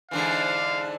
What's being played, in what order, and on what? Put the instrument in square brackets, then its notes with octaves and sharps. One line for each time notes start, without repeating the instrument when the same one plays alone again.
[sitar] G#2 D3 E3 [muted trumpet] F5